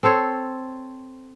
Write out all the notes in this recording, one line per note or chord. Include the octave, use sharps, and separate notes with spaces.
C4 A4 C5 C#5